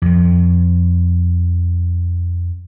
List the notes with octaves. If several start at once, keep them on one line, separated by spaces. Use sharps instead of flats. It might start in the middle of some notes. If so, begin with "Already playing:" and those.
F2 F3